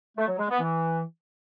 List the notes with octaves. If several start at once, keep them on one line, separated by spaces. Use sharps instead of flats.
A3
F#3
G#3
B3
E3